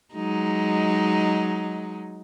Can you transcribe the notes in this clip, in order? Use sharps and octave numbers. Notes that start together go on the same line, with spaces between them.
F#3 G#3 D#4